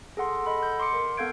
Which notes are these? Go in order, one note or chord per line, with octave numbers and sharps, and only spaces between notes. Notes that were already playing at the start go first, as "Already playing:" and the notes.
G#4 A4 F#5 C6
A4 D#5 F#5 B5
G6
C6 D6 C#7
A#4
B3 A4 F5 G6 G#6 D7